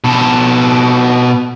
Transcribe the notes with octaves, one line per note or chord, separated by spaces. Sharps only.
B2 A4